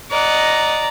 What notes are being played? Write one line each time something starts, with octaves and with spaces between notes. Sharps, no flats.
D5 D#5 F#5 A#5